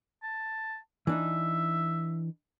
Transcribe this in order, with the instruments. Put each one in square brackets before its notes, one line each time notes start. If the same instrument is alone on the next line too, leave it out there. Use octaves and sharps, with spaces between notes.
[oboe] A5
[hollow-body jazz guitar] E3 D4 D#4 [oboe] E5